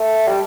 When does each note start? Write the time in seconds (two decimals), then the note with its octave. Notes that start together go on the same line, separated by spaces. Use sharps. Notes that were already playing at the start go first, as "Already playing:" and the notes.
Already playing: A3
0.28 G3